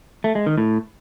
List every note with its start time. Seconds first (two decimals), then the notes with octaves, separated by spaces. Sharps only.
0.24 A3
0.35 G#3
0.46 D#3
0.58 A2